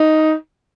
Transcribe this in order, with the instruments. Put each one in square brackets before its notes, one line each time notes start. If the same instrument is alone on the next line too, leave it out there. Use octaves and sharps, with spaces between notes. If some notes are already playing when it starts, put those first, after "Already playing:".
Already playing: [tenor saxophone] D#4